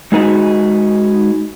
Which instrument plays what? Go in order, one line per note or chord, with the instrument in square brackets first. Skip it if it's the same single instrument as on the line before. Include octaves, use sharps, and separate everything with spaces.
[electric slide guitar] G#3 D#4 F#4 G#4 B4 D#5